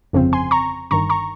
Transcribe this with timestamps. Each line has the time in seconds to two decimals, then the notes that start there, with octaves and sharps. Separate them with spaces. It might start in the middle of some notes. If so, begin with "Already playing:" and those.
0.13 G1 F2 C#3 F3 C4
0.33 G#5 C6
0.51 A#5 C#6
0.91 G1 G2 D#3 A#5 C#6
1.10 A#5 C#6